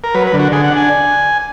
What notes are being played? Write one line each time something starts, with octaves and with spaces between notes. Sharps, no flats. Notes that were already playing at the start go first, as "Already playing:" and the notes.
A#4
F#3 B4
B4
D3
F#4
D3 G#4
F#5
D4
G#5